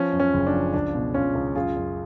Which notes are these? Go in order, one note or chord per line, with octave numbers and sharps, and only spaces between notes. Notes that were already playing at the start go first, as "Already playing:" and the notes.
Already playing: F3 C#4
F#2
C#4
F#1
D4
F3
C#2 D4
B2
C#2 C#4 F4
C#2
F#2 F4 G#4
F#2